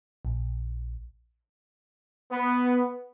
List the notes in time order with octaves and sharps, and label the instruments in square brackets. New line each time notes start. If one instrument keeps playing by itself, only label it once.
[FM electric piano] A#1
[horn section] B3